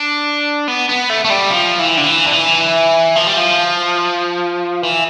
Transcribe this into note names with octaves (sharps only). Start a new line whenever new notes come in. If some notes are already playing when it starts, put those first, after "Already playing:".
Already playing: D4
B3
B3
A3
A3
G3
F3
E3
D3
E3
D3
E3
F3
G3
F3
E3